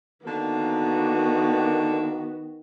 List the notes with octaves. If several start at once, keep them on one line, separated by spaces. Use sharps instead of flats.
D3 D#3 A#3 B3 F#4